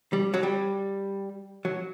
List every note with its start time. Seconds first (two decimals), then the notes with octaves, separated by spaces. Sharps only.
0.13 G3
0.34 F#3
0.43 G3
1.65 F#3